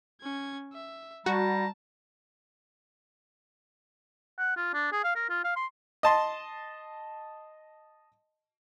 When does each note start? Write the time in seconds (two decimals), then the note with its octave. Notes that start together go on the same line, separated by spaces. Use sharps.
0.22 C#4 G#6
0.73 E5
1.26 G3 F#4 A5 A#5
4.38 F#5
4.56 F4
4.74 D4
4.92 G#4
5.04 F5
5.15 A#4
5.29 F4
5.44 F5
5.56 C6
6.03 D#5 A5 C6